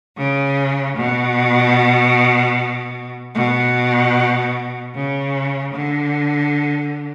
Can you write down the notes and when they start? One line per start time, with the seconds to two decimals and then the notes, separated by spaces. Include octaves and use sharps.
0.16 C#3
0.95 B2
3.34 B2
4.93 C#3
5.72 D3